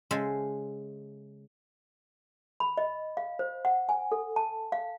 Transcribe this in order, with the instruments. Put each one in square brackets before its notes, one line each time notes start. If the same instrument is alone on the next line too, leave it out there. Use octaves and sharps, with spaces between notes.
[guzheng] C#3 G#3 A4 C5 E5
[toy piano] B5
D#5
F5
C5
F#5
G#5
A4
A5
F5